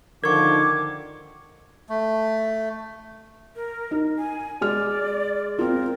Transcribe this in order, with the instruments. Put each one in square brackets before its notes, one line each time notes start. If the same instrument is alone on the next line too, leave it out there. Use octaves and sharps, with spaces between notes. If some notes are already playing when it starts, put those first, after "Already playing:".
[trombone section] D3 D#3 F3 [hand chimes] A#4 C#6 [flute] D6 [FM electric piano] G#6
[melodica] A3
[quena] A#4
[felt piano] D#4
[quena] G#5
[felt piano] G#3 F6 [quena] D5
[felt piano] C4 F4 [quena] A#4